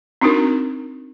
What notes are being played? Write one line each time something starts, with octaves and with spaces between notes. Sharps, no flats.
C4 D4 D#4 F#4 A#4